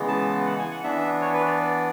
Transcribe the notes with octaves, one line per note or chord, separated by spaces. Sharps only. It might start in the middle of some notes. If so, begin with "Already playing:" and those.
Already playing: C#3 E3 G#3 B3
A5
F#5
G#5
F#5
E3 B3 D4 E5
C#5
B4
D5